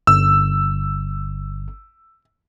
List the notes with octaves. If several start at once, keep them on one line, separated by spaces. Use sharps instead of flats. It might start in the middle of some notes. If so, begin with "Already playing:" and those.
G1 E6